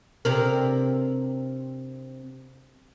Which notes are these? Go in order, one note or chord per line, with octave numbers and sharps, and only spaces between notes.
C3 D4 A#4